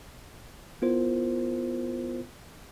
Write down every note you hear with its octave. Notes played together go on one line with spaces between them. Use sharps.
B3 E4 F4 A#4 C5